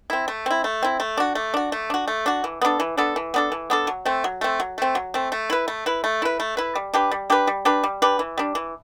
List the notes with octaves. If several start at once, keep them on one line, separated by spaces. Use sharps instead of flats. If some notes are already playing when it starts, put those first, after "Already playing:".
C4 E4
A3
C4 E4
A3
C4 E4
A3
D4 F#4
A3
D4 F#4
A3
D4 F#4
A3
D4 F#4
E3
B3 D4 A4
E3
B3 D4 A4
E3
B3 D4 A4
E3
B3 D4 A4
F#3
A3 C4
F#3
A3 C4
F#3
A3 C4
F#3
A3 C4
A3
E4 B4
A3
E4 B4
A3
E4 B4
A3
E4 B4
G3
D4 G4 B4
G3
D4 G4 B4
G3
D4 G4 B4
G3
D4 G4 B4
E3
G3 D4
E3